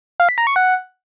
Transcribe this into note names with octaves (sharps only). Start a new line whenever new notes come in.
F5
B6
A#5
C#6
F#5